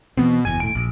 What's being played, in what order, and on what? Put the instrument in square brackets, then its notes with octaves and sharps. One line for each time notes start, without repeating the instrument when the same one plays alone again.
[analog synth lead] B2 [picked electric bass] E3 B3 C4
[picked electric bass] F#1 E2 [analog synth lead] G#5
[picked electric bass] E1 A2 [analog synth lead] D7
[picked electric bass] A#1